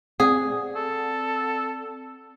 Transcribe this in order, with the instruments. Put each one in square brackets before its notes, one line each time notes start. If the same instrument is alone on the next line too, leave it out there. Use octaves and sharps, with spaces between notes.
[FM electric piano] C4 D5 F#5 [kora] G#4
[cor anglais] A4